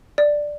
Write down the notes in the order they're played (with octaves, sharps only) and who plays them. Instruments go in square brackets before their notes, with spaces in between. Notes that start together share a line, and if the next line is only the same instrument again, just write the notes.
[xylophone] D5